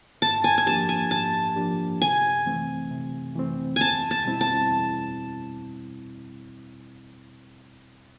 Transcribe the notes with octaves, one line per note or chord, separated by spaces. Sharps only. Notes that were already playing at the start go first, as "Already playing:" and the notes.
G#2 A5
G#5
G#5
F3 A#3 D4 G4 A5
G#5
G#2 A5
F3 A#3 D4 G4
C3 G#5
E3 A3 C4
C3
E3 A3 C4
E2 G#5 A5
A5
B2 G3 C4 E4
A5
E2